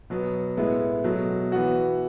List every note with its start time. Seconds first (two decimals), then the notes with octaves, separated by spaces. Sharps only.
0.10 B2 F#3 B3
0.57 A2 G#3 B3 E4
1.04 B2 F#3 A3
1.52 E3 B3 F#4